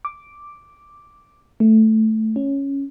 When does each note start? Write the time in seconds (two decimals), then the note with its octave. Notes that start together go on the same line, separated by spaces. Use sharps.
0.05 D6
1.60 A3
2.36 C#4